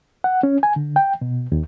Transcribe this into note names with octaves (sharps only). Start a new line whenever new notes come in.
F#5
C#4
G#5
D3
G5
B2
D#2